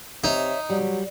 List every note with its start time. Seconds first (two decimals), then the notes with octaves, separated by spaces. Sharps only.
0.24 C3 D#4 C#5 E5
0.70 F#3 G3